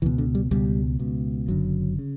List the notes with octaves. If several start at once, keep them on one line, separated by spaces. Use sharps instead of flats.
C#2 B2 E3
D3
G3
C#2 B2 G3
C#2 B2
F#1 F#2 D3 F#3
C#3